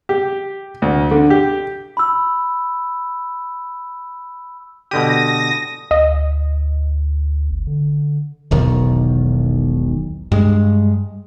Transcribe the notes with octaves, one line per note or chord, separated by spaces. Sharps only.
G4
D2
D3
G4
B5 E6
B2 D3 G4 D#6 A#6
D2 D#5
G1
D3
E1 B1 D#3
G2 G#3